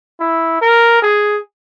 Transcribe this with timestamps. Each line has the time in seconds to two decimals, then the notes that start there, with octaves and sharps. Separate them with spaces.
0.20 E4
0.61 A#4
1.02 G#4